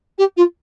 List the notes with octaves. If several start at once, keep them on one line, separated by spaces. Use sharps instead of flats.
G4
F4